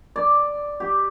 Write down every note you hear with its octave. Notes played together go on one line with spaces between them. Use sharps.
D5
G4